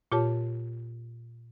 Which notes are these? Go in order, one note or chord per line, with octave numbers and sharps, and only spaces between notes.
A#2 F4 G4 C#5 A5